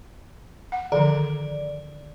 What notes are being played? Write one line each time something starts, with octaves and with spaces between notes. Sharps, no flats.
F#5
D3 D#3 F3 D5